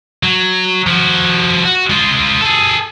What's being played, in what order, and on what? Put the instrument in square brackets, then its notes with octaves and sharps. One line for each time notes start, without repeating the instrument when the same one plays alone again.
[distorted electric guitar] F#3
F3 F#4
F#4
G#3 F4
G#4 A4